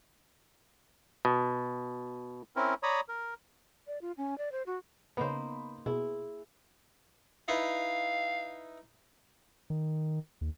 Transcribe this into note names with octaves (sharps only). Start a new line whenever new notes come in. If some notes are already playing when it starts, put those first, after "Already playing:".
B2
C4 C#4 E4 A#4
C#5 D5 A#5 B5 D#6
A#4
D5
F4
C#4
D5
C5
F#4
C#3 A#3 B3 D#4 C5 B5
B2 E4 G#4
D#4 E4 B4 F5
D#3
D#2